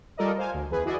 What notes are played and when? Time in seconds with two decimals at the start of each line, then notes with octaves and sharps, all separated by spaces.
0.17 G3 F4 A4 A#4 D5 D#5
0.38 C5 F5 G#5
0.54 D2
0.71 E2 G#4 B4
0.85 E4 F#4 G#4 D5 D#5 G#5